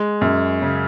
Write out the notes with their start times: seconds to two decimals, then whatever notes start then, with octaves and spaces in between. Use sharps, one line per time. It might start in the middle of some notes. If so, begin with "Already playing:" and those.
Already playing: G#3
0.21 F#2
0.62 C#3